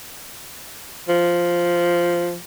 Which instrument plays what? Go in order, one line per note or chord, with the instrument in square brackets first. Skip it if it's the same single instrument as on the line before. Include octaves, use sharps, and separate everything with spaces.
[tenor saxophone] F3